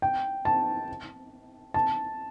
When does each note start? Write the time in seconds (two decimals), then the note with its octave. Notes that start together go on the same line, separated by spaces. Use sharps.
0.02 G5
0.45 A5
1.74 A5